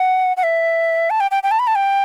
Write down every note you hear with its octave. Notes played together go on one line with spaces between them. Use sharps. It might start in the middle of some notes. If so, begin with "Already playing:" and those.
Already playing: F#5
F#5
E5
A5
G5
G5
G5
A5
B5
A5
G5